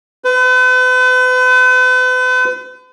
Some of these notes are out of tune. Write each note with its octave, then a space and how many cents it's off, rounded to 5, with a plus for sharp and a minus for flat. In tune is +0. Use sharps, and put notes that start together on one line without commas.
B4 +40